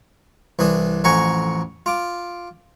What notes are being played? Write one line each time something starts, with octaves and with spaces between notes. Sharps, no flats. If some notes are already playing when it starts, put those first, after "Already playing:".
C2 E3 D4 D#6
A1 F2 F#5 G#5 A#5 C#6
F4 D6